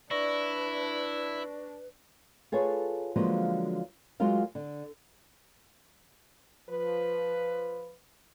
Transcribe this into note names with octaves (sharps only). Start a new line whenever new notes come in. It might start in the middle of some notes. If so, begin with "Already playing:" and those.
D4 E4 B4 D5 C#6 A#6
F4 G#4 A4 B4 C#5
D3 F3 F#3 G#3 A#3 B3
F#3 G#3 F4 F#4 A#4 F5
D3
F3 B4